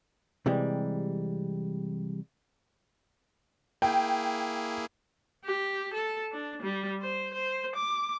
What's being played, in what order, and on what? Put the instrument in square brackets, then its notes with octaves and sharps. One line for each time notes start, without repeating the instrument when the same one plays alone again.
[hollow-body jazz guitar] C3 E3 G3 G#3
[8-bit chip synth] A#3 E4 G#4 [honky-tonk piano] G5
[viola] G4
A4
D4
G3
C5
C5
D6